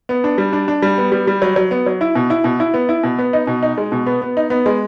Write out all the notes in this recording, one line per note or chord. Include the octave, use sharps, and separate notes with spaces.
B3
D4
G3
D4
D4
G3
B3
G3
G3
F#3
F#3
B3
F#3
E4
B2
E4
B2
E4
B3
E4
B2
B3
D#4
B2
D#4
G#3
B2
B3
B3
D#4
B3
G#3